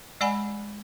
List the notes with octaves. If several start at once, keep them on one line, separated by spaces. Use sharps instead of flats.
G#3 D5 F#5 G#5 B5